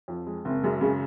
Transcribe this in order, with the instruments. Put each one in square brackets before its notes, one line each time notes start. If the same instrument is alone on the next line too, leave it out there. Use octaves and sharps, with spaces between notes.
[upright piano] F2
G#3
[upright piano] F#1 [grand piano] C4
[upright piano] F#2 [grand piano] G#3
[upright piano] C#3 [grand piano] G#3